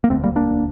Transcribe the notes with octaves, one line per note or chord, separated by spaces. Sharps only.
A#3
E1 D2 D3 A3 C4
G3 A#3
A#3 D4